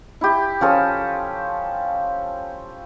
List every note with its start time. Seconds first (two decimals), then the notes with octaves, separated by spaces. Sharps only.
0.21 E4 G4
0.61 F3 C#4 A4 D#6